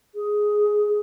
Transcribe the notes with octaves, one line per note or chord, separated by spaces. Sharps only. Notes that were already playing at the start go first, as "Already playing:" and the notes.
G#4